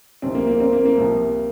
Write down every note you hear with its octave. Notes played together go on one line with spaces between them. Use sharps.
C2 C3 D#3 C4
A#3
A#3
C4
A#3
A#3
C2 C3 F3